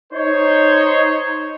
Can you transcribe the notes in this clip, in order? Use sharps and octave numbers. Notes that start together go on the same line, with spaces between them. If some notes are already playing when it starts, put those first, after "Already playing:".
D#4 C5 C#5